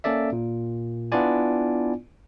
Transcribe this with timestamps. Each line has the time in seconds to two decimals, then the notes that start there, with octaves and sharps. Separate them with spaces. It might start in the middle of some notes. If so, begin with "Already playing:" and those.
0.04 A#3 C#4 A4 D5 E5
0.32 A#2
1.12 B3 D4 E4 F4 D5 G#5